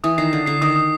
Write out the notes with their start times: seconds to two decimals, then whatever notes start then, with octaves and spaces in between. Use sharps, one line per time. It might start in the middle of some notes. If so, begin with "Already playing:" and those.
0.04 E3 D#6
0.18 D#3 C7
0.32 D3 C7
0.46 D3 C7
0.62 D#3 D#6
0.76 D#6